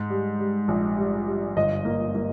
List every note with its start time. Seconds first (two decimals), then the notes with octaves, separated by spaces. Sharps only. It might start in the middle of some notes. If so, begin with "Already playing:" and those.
Already playing: G#2
0.10 G3
0.39 G3
0.68 A#1
0.97 G3
1.26 G3
1.56 G1 D#5
1.85 A#3
2.15 A#3